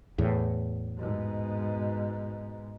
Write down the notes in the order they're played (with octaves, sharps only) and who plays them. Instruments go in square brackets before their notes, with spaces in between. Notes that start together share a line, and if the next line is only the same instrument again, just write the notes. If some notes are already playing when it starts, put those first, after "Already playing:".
[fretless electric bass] E2 A2
[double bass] G#2 B2